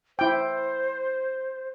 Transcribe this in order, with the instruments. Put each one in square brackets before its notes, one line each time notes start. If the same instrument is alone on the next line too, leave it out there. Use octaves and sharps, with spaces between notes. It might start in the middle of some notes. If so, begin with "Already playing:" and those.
[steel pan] E4 G5 [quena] C5